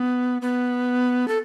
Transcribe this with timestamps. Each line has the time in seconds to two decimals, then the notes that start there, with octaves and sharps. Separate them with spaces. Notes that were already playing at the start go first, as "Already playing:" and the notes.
Already playing: B3
0.42 B3
1.28 A4